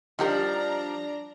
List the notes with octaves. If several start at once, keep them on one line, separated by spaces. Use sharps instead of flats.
F3 G3 D4 D#4 G4 A#4 A#5